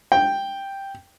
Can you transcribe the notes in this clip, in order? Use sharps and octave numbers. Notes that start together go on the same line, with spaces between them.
G5